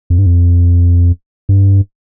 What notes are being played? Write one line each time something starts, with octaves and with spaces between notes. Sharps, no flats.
F2
G2
F2
G2